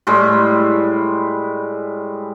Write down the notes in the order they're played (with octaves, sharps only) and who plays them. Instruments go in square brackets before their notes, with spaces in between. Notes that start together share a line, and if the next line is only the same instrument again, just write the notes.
[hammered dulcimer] A2 G3 G#3